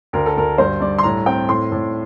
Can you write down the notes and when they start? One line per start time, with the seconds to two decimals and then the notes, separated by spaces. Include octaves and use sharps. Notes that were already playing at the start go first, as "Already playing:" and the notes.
0.13 D2 A#4
0.26 A4
0.36 D2 A#4
0.58 G2 C5
0.81 G2 D5
0.99 C6
1.03 A2 A#5
1.26 C4 G5
1.49 A2 C6
1.72 A2